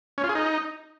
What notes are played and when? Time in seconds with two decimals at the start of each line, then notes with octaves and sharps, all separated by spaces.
0.18 C#4
0.24 F4
0.29 G#4
0.35 D#4